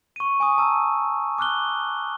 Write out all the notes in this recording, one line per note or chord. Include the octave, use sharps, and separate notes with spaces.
C#6 D#7
G#5 C#6 D#6
A5 A#5 E6
D6 F6 F#6 G7